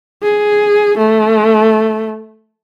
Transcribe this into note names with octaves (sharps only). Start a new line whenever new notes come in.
G#4
A3